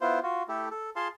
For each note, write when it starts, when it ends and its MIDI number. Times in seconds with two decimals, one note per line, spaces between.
0.01 0.19 59
0.01 0.19 64
0.01 0.19 65
0.01 0.19 72
0.23 0.43 65
0.23 0.43 66
0.48 0.69 57
0.48 0.69 64
0.48 0.69 67
0.48 0.69 69
0.71 0.90 69
0.96 1.08 65
0.96 1.08 68
0.96 1.08 77
0.96 1.08 81
0.96 1.08 84